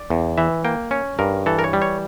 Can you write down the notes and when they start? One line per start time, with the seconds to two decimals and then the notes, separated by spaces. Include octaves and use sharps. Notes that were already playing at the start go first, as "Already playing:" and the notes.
Already playing: D5
0.10 E2
0.38 E3 E5
0.64 A#3 G5
0.91 C#4 C#5
1.19 G2 A#4
1.46 E3 A4
1.59 A#4
1.64 C#5
1.73 G3
1.82 C#5